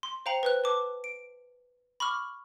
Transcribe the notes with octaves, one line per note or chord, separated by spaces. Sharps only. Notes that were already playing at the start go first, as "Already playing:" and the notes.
C6
C5 F5 G5 A#5 C#7 F#7
B4 C5 F#6
B4 A5 D6
D7
B5 C#6 D6 F6